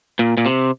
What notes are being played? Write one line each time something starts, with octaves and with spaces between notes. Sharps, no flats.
A#2
A#2
C3